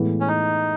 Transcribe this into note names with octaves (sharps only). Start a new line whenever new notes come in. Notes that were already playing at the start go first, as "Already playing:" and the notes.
Already playing: A2 E3 G#3 B3 E4
C#4
D#4